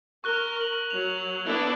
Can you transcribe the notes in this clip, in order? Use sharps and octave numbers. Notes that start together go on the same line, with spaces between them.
A#4 C#6 F#6 G7
C#6 F#7
F#3 F7
B3 D4 E4